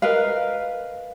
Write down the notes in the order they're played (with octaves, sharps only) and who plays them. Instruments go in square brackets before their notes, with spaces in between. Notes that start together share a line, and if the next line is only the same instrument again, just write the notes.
[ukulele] A#4 B4 D#5 F5